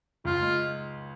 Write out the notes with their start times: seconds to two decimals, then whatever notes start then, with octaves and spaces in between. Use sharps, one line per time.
0.25 C#2 F4
0.42 G#3